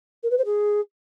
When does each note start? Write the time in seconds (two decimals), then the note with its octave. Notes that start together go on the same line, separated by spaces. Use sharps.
0.23 A#4
0.31 B4
0.38 C5
0.45 G#4